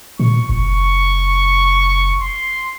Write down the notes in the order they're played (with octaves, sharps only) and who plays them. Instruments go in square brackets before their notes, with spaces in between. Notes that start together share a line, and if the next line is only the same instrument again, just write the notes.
[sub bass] A#2 [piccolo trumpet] C#6
[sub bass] F#1 [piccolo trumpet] C#6
[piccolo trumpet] C6